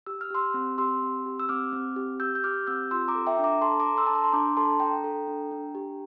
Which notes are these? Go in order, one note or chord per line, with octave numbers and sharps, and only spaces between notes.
G4 E6
F6
G4 C6 E6
C4
G4 C6 E6
C4
G4
E6
C4 D6 F6
C4
G4
G4 E6 G6
G6
G4 D6 F6
C4 E6 G6
F4 C6 E6
A#5 D6
A4
E5 G5
D4
A#5 D6
A4 A5 C6
A#5 D6
A4
C6 E6
D4 A5
A#5
C6
D4 A#5 D6
A4 A5 C6
D4 G5 A#5
A4
D4
D4
G4